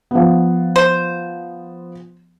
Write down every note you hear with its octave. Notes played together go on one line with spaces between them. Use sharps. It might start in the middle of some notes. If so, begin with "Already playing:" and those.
F3 B3
C5